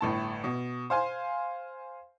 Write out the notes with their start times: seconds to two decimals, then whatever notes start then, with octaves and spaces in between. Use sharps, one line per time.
0.01 G1 A2 A5
0.44 B2
0.90 C5 F5 G#5 C6